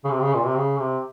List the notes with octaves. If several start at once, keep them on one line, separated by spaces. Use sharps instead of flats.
C#3
C3
C#3
A#2
C3
C#3
C3